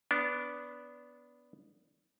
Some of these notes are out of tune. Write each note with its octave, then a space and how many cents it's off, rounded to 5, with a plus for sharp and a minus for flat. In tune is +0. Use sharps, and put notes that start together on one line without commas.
B3 +0 D4 -20